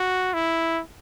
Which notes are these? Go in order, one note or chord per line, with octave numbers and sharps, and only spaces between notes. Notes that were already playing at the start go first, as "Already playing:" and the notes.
Already playing: F#4
E4